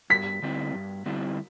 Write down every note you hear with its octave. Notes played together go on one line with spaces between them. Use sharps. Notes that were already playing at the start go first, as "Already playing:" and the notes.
G2 B6
D3 G3 C4 E4
G2
D3 G3 C4 E4